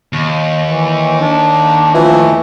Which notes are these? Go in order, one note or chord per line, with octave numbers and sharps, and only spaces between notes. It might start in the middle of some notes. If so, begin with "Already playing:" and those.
D#2
E3
D#3 D4
E3 F3 A3